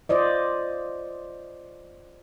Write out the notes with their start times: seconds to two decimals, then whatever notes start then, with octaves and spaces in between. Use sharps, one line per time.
0.09 F4 C5 D5 D#5